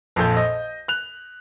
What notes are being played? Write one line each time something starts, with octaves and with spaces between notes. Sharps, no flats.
A#1 F2 A4 G6
D#5
F#6 F7